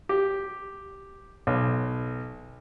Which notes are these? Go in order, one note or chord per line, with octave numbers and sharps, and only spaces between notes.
G4
B1